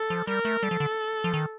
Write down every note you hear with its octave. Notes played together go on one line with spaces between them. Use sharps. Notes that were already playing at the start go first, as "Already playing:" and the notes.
Already playing: A4
F3
G3 A#4
A3
G3 A4
F3
D3
F3
D#3